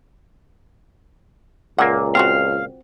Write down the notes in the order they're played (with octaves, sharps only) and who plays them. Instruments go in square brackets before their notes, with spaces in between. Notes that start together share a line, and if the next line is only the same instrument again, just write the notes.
[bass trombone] C#2 [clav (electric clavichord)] A#2 A#3 [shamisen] F4 F#5
[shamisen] C4 F4 F#4 [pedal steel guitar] F5